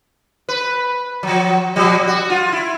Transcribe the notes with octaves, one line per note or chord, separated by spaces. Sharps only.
B4
F3 F#3
B2 F3 G3
F#4
F4
E4